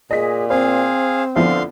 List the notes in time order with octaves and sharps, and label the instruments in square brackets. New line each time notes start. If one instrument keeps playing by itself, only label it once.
[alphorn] A#2 [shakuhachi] G#4 [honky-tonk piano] D#5 B6
[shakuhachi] C4 [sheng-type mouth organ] G#4 F5 [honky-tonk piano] C5
[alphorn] D3 [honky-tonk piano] F3 B3 E4 [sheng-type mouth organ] F5 C6